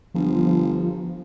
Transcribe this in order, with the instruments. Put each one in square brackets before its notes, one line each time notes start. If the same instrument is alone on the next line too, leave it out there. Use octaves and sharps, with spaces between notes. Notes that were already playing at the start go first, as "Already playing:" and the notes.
[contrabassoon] G1 [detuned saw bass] F3